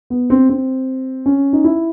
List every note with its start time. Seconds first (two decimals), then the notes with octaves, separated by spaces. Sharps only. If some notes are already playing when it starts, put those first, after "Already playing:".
0.10 B3
0.30 C4
0.49 C4
1.26 C#4
1.53 D#4
1.64 E4